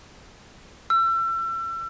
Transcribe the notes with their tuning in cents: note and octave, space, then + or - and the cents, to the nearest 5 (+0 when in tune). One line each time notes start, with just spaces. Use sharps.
E6 +35